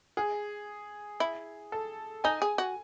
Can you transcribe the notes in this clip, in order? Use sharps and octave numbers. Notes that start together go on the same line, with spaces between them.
G#4
E4
A4
D#4 G#5
G#4
F#4